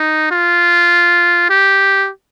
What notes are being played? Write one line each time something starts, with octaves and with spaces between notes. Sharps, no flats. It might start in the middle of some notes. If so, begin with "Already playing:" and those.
Already playing: D#4
F4
G4